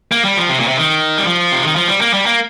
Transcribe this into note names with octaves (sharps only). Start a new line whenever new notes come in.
A#3
G3
F3
C3
A#2
C3
D#3
G3
F3
C3
D#3
F3
G3
A#3
G3
A#3